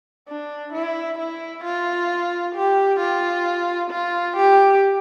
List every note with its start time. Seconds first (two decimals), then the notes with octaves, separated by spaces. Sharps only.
0.28 D4
0.73 E4
1.19 E4
1.64 F4
2.55 G4
3.00 F4
3.91 F4
4.37 G4